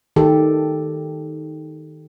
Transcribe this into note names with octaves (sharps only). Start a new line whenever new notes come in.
D#3 G4 A4